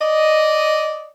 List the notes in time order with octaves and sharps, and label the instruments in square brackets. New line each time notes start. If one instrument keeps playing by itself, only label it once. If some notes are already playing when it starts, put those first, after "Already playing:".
[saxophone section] D5 D#5